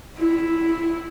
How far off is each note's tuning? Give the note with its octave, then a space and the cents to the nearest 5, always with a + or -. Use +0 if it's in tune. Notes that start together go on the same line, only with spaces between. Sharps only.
E4 +0